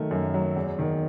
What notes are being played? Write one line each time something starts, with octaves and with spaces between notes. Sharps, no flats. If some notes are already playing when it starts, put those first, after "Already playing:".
Already playing: D#3 F#3 A3
F#2
F#3
E2
D#3